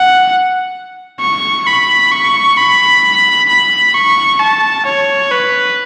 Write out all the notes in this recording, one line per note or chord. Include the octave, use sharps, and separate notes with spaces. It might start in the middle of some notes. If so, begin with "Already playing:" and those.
Already playing: F#5
C#6
B5
C#6
B5
B5
C#6
A5
C#5
B4